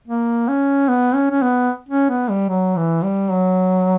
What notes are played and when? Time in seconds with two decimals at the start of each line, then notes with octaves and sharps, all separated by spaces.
0.08 A#3
0.48 C#4
0.89 B3
1.14 C#4
1.31 C#4
1.42 B3
1.89 C#4
2.10 B3
2.30 G3
2.49 F#3
2.76 E3
3.04 G3
3.30 F#3